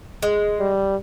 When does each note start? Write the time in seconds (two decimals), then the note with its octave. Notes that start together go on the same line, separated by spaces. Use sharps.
0.22 G#3
0.60 G3